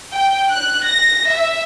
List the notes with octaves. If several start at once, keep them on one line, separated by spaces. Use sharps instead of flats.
G5
F#6
A#6
E5